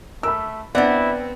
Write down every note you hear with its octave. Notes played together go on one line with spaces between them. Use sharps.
A3 A#4 B5 E6
B3 C4 D4 E4 D5 F#5